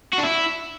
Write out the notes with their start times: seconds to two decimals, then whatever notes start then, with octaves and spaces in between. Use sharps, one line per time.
0.13 F#4
0.18 D4
0.23 E4